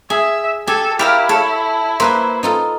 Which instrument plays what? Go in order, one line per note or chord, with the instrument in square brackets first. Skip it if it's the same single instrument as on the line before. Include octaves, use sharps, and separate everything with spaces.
[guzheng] G#4 [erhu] E5 [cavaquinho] G#5
[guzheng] G4 [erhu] A4 [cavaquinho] G#5
[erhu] E4 [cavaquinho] G4 A#4 F5 [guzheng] D5
[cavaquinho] A4 [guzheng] C#5
[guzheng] A#3 B4 E5 [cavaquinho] C5
[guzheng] D#4 F4 A4